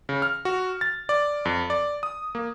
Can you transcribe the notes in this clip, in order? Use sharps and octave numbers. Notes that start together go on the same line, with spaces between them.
C#3
F6
F#4
A6
D5
F2
D5
D#6
A#3